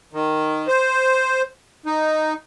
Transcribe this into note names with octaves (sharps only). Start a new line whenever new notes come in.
D#3
C5
D#4